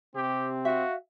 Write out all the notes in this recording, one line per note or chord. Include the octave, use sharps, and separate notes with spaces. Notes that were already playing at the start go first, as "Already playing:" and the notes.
C3 C4 G4
F#4 E5 F5